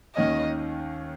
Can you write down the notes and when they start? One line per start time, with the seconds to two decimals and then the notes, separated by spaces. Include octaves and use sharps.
0.16 D#2 D#3 A#3 C#4 D#5